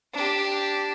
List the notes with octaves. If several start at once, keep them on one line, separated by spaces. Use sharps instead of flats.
D4 G4